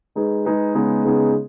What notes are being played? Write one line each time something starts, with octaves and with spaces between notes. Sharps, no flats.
G#3 D#4 G#4 B4
G#3 D#4 G#4 B4
C#3 G#3 B3 D#4 G#4
C#3 G#3 B3 D#4 G#4